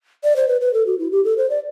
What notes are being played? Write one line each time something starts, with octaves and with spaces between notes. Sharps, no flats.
D5
C5
B4
B4
A4
F#4
E4
G4
A4
C5
D5